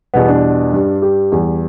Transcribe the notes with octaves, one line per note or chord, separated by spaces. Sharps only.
E2 B2 G3 B3
D4
G2 G3
G4
E2 E3 G3